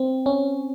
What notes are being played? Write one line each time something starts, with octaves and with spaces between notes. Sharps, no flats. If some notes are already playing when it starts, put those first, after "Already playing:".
Already playing: C4
C#4